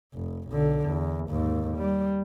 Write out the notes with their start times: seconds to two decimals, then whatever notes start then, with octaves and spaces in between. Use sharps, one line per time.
0.15 F1
0.49 B1 D3
0.86 E2
1.29 D#2 G#2
1.77 G3